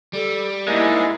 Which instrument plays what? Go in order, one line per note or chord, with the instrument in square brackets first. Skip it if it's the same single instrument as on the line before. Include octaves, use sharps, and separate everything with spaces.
[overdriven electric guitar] G3 [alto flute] A4
[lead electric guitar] G#2 G#3 [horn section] A#3 D#5 [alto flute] E4